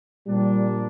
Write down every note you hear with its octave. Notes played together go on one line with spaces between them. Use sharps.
A#2 F3 G3 A#3 D4